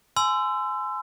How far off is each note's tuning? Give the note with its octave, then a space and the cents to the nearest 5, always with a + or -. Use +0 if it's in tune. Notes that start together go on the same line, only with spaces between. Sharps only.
G#5 +20 C6 -25 E6 +20